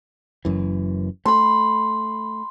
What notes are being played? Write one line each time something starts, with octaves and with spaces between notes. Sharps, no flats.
F#1 F#2 E3
A3 B5 C6